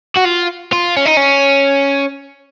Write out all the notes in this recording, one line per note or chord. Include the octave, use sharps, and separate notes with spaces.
F#4
F4
F4
C#4
D#4
C#4